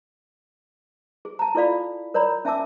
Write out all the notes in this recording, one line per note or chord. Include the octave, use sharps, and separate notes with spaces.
G#4
A5 A#5
E4 F4 A4 D5 F5 B5
A#4 C#5 D5 A#5 B5
C#4 E5 G#5 A5 D6 E6